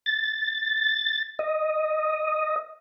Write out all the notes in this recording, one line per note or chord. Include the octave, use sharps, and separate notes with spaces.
A6
D#5